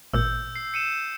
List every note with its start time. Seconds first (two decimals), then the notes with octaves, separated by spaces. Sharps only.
0.14 G#1 A#2 E6 G6
0.56 C7
0.74 C#7 D#7 E7